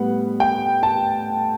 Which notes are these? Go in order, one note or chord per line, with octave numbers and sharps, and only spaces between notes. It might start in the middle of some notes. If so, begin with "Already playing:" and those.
Already playing: A2 G3 B3 F#5
G5
A5